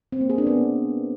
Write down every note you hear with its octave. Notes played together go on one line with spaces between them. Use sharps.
C4
A#3
G#4
D4
B3